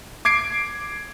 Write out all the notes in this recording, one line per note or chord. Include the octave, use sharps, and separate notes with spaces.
D6 G#6 C7 D7